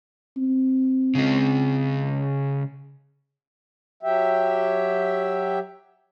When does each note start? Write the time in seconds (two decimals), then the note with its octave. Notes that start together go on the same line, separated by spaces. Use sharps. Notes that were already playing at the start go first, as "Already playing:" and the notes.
0.37 C4
1.15 C#3 G#3
4.03 F#3 G4 E5